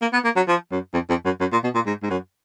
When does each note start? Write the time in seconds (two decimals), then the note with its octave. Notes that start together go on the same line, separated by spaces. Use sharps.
0.01 A#3
0.13 B3
0.24 A#3
0.36 F#3
0.48 F3
0.71 F#2
0.93 F2
1.09 F2
1.25 F#2
1.40 F#2
1.52 A#2
1.64 B2
1.75 A#2
1.86 G#2
2.03 G#2
2.10 F#2